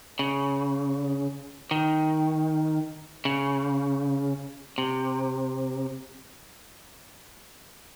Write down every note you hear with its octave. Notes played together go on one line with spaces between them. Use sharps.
C#3
D#3
C#3
C3